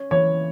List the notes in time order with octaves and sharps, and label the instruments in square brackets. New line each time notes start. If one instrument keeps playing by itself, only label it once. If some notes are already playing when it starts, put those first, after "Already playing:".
Already playing: [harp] C#4
[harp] E3 [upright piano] C#5